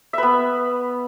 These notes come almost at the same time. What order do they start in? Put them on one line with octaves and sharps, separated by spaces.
E5 B4 B3